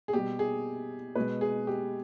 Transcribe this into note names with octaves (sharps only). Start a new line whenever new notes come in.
G#4
B2 G3 G4
G#4
B2 G#3 B4
G#4
G4